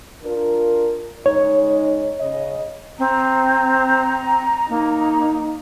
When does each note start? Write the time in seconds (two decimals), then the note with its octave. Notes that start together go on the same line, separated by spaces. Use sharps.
0.23 D4 F4 A#4
1.26 C#3 G#3 D#4 C#5
2.20 C#3 D#5
2.99 C4 A#5
4.69 A#3 D#4